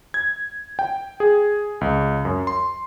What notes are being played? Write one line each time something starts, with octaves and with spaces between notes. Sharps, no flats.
G#6
G5
G#4
C#2
F#2
C6